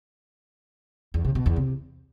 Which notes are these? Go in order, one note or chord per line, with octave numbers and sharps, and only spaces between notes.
E2
C3
B2
E2
C3